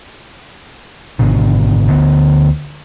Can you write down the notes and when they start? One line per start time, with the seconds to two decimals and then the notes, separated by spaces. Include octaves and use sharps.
1.19 G#1 B2 D3
1.88 D2 D3 B3